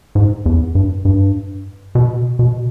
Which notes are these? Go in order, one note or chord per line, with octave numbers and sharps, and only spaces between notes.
G#2
E2
G2
G2
B2
B2